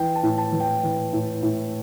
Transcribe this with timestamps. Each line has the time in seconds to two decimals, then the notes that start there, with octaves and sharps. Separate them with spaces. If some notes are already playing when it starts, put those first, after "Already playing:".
Already playing: E3 G5
0.15 A5
0.23 A2
0.38 A5
0.52 E3
0.60 G5
0.83 E3
1.13 A2
1.43 A2